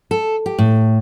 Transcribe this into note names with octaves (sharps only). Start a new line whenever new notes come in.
A4
G4
A2